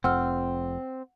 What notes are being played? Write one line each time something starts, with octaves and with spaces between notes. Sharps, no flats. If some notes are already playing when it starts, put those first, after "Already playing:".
F1 F2 C4 F#5 E6 F6